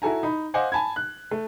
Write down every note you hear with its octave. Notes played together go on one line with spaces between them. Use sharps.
E4 F#4 A4 G#5 A#5
D#4 B5
C5 D#5 F5 F#5 G#5 D6
G#5 A5 B5 G#6
F#6
A3